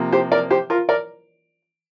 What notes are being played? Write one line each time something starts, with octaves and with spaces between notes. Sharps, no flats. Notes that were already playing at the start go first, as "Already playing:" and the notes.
Already playing: C3 F3 A#3
G4 C5
A#4 D5
G4 C5
F4 A#4
A#4 D5